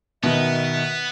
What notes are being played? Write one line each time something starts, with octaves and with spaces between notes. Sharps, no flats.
B2 D#3 B3 E5